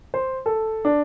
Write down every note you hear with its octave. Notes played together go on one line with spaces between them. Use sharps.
C5
A4
D4